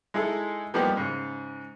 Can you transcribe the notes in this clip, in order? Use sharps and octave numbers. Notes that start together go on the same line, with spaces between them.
G#3 D#4 E4 G#4 A4
F3 G3 A#3 B3 D#4 G4
G#2 C#3